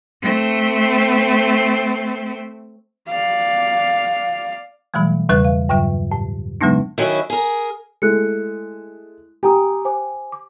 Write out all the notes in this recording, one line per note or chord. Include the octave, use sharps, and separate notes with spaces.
A3 C4
D5 F5
B2 E3 F#3 G3 A3
E2 C#3 G3 B4 E5 F#6
F5
G2 C#3 F#3 E5
A2
C#3 F#3 G#3 B3 D4 D#4
D#3 F#3 C#4 E4 F#4
G#4 A#4
G#3 A3 E4 F#6 C#7
G4 G#5 A#5 D#6
C5 G#5 D6
D6